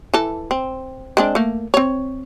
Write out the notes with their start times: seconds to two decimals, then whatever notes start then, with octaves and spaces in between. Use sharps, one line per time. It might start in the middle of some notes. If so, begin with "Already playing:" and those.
0.14 E3 A4
0.51 C4
1.17 G#3 C4 D4
1.35 A3 A#3
1.74 C4 C#5